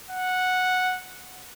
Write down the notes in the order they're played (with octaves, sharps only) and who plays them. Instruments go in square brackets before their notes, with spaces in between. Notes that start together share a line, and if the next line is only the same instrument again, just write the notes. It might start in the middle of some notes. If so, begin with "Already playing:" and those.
[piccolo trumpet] F#5